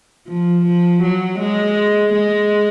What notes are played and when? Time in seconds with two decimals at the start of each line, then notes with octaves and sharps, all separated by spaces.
0.28 F3
0.66 F3
1.03 F#3
1.39 G#3
2.14 G#3